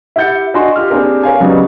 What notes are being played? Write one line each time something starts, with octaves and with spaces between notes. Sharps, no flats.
E4 G4 F#5 G6 A6 C#7
D4 F#4 D5 D#5 G#5 C6
F4 G4 F6
A#3 C4 D4 G4 G#4 A#4
A#4 C#5 F5 G#5
C#3 F#3 G3 B3 D#4